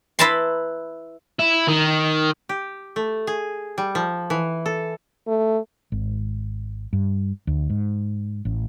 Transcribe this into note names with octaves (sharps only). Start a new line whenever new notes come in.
E4 B4 A5 A#5 C6
E4
D#3
G4
A3
G#4
G3
F3
E3
A4
A3
G#1
G2
D2
G#2
A1